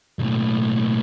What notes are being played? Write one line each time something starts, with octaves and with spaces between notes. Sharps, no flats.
B1 A2